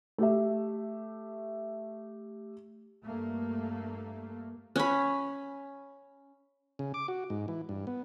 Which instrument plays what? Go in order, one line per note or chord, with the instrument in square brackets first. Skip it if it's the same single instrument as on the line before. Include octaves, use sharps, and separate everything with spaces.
[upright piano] A3 G4 E5
[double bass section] G2 A3 A#3
[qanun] C#4 B5
[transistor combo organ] C#3
D6
F#4
G#2
E3
G2
B3